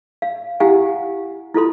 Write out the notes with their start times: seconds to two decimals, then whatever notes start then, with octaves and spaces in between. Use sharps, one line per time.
0.22 F5
0.60 E4 G4 F5 F#5 G#5
1.54 E4 F4 A4 C6